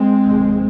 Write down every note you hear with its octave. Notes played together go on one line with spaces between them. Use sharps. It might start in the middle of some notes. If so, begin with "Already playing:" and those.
Already playing: G#3 C4
F1 D#2